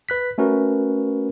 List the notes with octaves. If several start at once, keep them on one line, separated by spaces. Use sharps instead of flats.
B4 F#6 B6
A3 C#4 F#4 A#4 B4